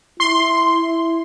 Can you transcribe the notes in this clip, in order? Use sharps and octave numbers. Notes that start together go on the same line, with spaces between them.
E4 C6